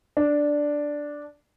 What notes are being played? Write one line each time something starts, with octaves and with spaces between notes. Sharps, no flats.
D4